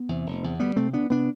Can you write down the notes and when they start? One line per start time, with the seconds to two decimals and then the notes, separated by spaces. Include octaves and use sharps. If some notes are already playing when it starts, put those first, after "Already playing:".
Already playing: B3
0.09 E2 C3
0.26 F1
0.43 E2 C3
0.60 D2 G3 B3
0.76 C3 A3 C4
0.93 D2 B3 D4
1.10 C3 B3 D4